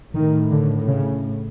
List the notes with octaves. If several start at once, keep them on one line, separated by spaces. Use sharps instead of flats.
A2 D#3
D3
C#3